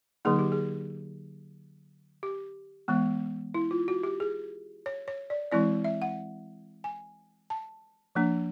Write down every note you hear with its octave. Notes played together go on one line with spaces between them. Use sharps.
D3 F#3 A#3 D#4 G#4
G4
G#4
G4
E3 G#3 B3
E4
F4
F#4
G4
G#4
C#5
C#5
D5
E3 G#3 C4 E4 D5
E5
F#5
G#5
A5
F3 A#3 D4